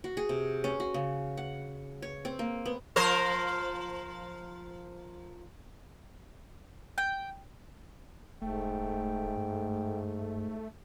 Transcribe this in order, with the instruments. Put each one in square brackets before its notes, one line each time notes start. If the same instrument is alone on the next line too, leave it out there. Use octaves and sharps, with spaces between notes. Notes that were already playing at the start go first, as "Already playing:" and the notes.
[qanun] F#4
G#4
C3
C#4
F#4
C#3
F#5
C#5
C4
A#3
B3
[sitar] F3 A#4 C5
[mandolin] G5
[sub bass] E1 [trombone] G#2 [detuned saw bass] A3 [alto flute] G5
[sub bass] G2